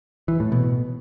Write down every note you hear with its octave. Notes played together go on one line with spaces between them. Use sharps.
E3
A2
B2